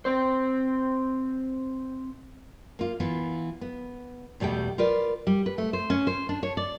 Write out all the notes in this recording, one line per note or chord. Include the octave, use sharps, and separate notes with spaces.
C4 C5
A#3 F4
E3 B3 F4
B3
E2 B2 G3 A3 G5
F4 A#4 B4 D5
G3
B4
A3
C5
C#4
C5
D4
C#5
D5